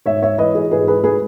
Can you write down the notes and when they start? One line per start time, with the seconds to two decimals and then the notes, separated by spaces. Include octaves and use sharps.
0.06 G#2 C#5 E5
0.22 C#5 E5
0.38 E3 B4 D#5
0.55 G#4
0.71 G#2 G#4 B4
0.87 G#4 B4
1.04 G#3 G#4 B4